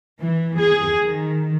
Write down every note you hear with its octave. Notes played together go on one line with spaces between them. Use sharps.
E3
G#4
D#3